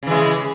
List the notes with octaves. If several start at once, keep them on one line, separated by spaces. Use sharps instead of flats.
C#3 E3 G#3